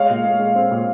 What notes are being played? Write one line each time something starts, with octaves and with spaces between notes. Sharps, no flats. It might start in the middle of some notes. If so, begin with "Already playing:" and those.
Already playing: G#3 C#5 F5
A#2
G#3
G#3
C4
A#2